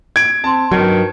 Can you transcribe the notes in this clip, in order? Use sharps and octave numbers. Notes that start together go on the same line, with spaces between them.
G#6 D7
C4 A5
G2 D#3 F#3